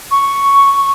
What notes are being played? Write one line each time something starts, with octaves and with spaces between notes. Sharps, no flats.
C#6